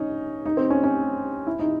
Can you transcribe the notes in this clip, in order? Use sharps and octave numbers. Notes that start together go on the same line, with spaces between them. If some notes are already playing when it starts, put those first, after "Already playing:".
Already playing: C#4 D#4
D#4
C4
C#4
C#4
E4
D#4